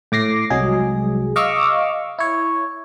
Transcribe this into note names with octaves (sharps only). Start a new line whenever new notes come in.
A2 D6 A#6 C7
C2 F#3 G#3 G#4
D#5 F5 C#6 D6 E6 F6
E4 C#5